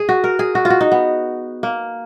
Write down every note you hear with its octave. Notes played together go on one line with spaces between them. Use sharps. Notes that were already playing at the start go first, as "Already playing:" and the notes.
Already playing: G#4
F#4
A#4
G#4
F#4
F4
F#4
D#4
B3
A#3